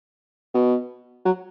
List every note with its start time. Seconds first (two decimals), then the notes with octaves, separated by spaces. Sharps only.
0.55 B2
1.26 F#3